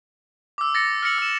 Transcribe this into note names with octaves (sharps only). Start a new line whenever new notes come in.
D6 E6
A6 A#6 C#7
F6 A#6 C#7 F#7
E6 E7